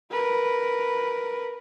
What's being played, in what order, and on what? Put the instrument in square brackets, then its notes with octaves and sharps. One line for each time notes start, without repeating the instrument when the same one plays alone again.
[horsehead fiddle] A#4 B4